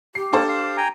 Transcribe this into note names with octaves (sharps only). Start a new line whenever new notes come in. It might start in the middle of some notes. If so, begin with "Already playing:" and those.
G4 C7
A#3 D4 A4 C5
F5
G5 G#5 A#5